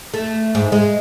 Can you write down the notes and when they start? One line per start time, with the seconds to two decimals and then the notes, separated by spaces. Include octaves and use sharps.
0.14 A3
0.55 G#2
0.72 G#3